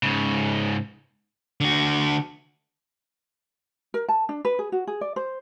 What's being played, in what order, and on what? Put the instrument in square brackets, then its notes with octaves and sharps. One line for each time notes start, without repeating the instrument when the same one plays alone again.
[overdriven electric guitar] G#2 C#3
[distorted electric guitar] D3 F#4
[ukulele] A#4
A5
D4
B4
G#4
F#4
G#4
D5
C5